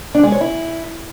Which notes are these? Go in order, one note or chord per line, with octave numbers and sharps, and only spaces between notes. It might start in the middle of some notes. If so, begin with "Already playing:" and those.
D4
G#3
C#5
E4